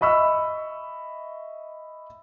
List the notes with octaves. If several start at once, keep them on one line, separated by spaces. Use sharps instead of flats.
D#5 E5 B5 C#6 E6